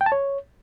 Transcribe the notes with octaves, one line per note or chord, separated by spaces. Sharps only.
G5
A5
C#5